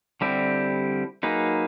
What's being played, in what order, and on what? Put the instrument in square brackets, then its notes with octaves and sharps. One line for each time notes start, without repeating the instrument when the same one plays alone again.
[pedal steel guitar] D3 G3 C4 E4 G4
F#3 A#3 D#4 G#4 B4